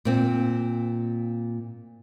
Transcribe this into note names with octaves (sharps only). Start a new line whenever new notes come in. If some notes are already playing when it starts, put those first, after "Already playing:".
A#2 C4